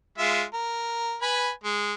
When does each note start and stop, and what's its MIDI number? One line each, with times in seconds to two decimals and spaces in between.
0.18 0.43 56
0.18 0.43 65
0.18 0.43 76
0.53 1.16 70
1.22 1.50 71
1.22 1.50 80
1.22 1.50 83
1.64 1.93 56